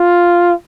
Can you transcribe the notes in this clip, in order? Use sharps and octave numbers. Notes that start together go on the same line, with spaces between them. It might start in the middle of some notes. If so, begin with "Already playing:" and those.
Already playing: F4